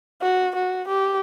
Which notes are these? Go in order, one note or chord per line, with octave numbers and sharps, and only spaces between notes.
F#4
F#4
G4